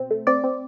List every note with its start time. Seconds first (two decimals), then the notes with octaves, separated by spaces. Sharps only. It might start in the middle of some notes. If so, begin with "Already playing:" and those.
Already playing: B2 C4
0.11 A3
0.27 C4 D5
0.44 C4